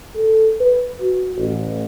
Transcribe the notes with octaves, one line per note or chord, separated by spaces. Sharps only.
A4
B4
F#4
A1